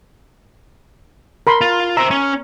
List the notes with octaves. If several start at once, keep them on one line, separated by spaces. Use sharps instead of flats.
A#4 B5 C6
F4
C5 E5 A#5
C#4